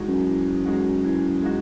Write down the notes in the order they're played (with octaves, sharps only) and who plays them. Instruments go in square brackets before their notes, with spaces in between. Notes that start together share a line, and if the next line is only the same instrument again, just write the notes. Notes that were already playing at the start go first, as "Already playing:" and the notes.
Already playing: [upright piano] E3 G#3 D#4 F#4
[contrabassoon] F#2
[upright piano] E3
G#3 D#4 F#4
E3
G#3 D#4 F#4